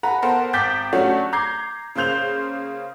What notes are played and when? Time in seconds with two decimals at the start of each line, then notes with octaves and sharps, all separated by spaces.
0.03 A4 B4 F#5 A#5
0.22 B3 A4 A#4 C5 F#5
0.53 G#1 G5 D6 G6 A6 B6
0.93 F#3 A3 C#4 D4 F#4
1.33 A#5 D6 G6 G#6 C7
1.96 C#3 A#3 C5 G6 F7